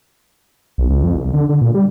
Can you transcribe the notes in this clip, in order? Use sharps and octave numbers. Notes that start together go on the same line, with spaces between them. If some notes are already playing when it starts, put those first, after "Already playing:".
B1
C#2
F2
C2
D3
D3
A#2
G3